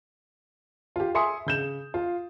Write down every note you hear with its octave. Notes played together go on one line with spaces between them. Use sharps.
F4 G4
E5 G#5 C6 D#6 C#7
C#3 G6 E7
F4